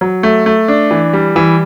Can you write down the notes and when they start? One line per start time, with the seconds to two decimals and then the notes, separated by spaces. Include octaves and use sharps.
0.01 F#3
0.23 A3
0.46 A3
0.68 D4
0.91 E3
1.13 G3
1.36 E3